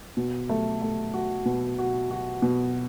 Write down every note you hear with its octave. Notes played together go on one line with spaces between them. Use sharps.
B2
A3
A3
F#4
B2
F#4
F#4
B2